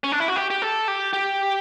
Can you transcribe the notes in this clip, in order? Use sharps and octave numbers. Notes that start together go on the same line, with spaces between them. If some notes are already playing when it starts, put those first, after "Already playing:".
C#4
D4
E4
F#4
G4
G4
A4
G4
G4